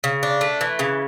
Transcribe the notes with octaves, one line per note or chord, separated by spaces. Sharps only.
C#3
D4
A3
E3
C#3